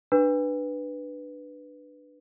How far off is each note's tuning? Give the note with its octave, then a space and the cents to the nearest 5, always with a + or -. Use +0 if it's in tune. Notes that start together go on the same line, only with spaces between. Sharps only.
D4 +20 B4 +0